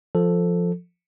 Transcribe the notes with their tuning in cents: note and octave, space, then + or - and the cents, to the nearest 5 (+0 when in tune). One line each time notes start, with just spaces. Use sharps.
F3 +0 A4 +0